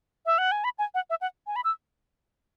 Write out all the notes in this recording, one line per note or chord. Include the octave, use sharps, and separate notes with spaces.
E5
F#5
G#5
B5
G#5
F#5
E5
F#5
G#5
B5
E6